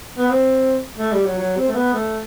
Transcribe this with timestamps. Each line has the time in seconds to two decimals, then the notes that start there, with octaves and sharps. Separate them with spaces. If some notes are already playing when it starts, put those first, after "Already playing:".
0.18 B3
0.30 C4
0.98 A3
1.12 G3
1.26 F#3
1.39 F#3
1.57 C4
1.68 A3
1.75 B3
1.93 A3